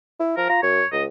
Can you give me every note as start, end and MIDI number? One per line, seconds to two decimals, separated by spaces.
0.20 0.34 64
0.37 0.44 53
0.37 0.46 70
0.49 0.62 65
0.49 0.59 82
0.63 0.81 42
0.63 0.86 73
0.92 1.07 37
0.92 1.03 75